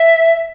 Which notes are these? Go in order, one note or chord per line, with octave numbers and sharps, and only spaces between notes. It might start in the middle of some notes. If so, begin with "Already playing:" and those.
Already playing: E5